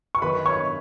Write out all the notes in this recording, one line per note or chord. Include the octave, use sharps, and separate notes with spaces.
C#6
F#2 D#3 B4 B5
C#5 C#6